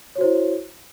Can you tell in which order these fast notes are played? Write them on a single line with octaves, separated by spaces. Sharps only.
C#5 F#4 C5 E4